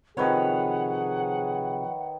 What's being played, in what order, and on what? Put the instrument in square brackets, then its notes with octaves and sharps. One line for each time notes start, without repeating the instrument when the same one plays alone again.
[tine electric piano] C3 F3 [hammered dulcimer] D#3 B4 C#5 [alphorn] G#4 [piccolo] F#5